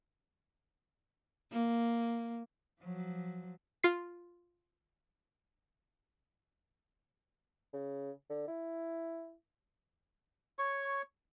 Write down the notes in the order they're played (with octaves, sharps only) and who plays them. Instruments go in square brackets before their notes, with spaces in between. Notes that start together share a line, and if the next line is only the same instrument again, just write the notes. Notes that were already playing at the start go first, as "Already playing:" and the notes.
[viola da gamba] A#3
[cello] F3 F#3
[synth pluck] F4 C7
[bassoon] C#3
D3
E4
[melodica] C#5 C#6